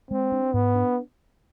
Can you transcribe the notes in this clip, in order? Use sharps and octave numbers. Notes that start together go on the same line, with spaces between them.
G#3 C4
D4
G#2 B3
D4